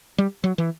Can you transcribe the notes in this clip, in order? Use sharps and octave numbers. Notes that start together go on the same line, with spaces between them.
G3
F#3
E3